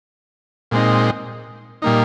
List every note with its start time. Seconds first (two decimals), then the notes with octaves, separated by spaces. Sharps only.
0.71 A#2 G#3 C4 D#4
1.82 A#2 G3 A#3 D#4